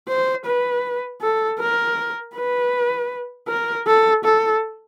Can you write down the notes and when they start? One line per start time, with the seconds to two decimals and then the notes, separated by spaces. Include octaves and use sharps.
0.08 C5
0.46 B4
1.21 A4
1.60 A#4
2.35 B4
3.48 A#4
3.87 A4
4.24 A4